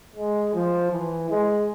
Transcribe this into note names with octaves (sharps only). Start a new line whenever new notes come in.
G#3
F3
E3
G#3